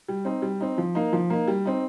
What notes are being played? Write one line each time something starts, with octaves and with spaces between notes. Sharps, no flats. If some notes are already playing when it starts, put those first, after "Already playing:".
G3
C4 D#4
G3
C4 D#4
F3
A#3 D#4
F3
A#3 D#4
G3
C4 D#4